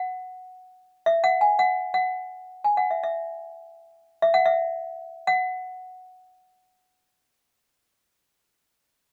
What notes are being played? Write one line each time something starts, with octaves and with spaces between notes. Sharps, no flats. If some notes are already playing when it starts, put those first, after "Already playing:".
Already playing: F#5
E5
F#5
G#5
F#5
F#5
G#5
F#5
E5
E5
E5
F#5
E5
F#5